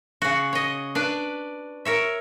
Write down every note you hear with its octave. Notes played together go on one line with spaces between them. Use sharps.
C#3 F#4
C#5 D#5
D4 B4 D5
A#4 C#5 E5